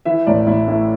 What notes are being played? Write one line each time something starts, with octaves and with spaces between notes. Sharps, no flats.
E3 E5
A1 D5
A1 E4
A2 E4